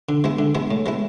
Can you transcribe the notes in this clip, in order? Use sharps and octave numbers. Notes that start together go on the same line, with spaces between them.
D3
G#3 B3 E4
D3
G#3 B3 E4
A2
G#3 B3 E4